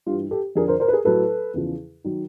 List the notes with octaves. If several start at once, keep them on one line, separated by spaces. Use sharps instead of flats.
G2 E3 F4 G4
G4 A4
F2 D3 F3 G#4 A#4
A#4 C5
A#4 C5
B4
G#4 A#4
A2 F#3 A4 B4
E2 C#3 F3
D#3 F#3